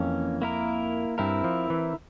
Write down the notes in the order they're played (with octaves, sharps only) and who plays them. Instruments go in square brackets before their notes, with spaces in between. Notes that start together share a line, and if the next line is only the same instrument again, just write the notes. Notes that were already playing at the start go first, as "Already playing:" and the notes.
Already playing: [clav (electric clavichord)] F2 [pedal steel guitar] E3 A#3 C#4
[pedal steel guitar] A#3 E4 A#4
[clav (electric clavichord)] G2 [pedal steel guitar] C4 E4 A#4
[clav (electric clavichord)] F3
E3